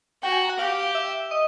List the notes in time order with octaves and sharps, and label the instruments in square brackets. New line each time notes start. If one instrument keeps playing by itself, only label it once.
[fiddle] F#4 [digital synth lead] G5
[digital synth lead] G#5
A#5
F#5
[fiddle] G4 [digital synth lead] F5
[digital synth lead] E5
D#5